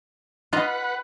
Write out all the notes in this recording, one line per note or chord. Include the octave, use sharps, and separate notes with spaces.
F4 B4 D#5 F#5 A#5